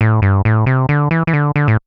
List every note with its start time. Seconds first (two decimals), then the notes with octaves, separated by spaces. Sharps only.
0.01 A2
0.22 G2
0.45 A2
0.66 C3
0.89 D3
1.11 E3
1.27 E3
1.33 D3
1.56 D3
1.68 A2